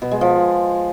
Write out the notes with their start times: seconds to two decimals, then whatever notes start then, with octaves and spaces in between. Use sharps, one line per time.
0.02 B2
0.11 G#3
0.21 F3